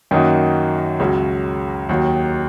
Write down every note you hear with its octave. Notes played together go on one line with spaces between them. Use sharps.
F#2 D#3 A#3 D#4 F#4
C#2 C#3 F#3
D#2 D#3 F#3